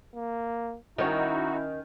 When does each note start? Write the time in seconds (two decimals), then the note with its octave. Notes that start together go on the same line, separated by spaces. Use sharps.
0.15 A#3
0.98 D#3 C#4 D#4 E4 F#4